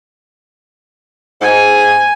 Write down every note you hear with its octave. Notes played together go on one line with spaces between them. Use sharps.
G#2 G#5